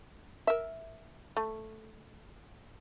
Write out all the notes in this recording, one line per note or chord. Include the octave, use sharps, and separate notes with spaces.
A#4 E5
A3